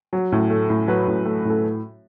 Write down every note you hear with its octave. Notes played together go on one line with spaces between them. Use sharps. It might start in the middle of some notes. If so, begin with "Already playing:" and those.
F#3
A2
A3
A2
F#3 B4
A2
A3
A2 A4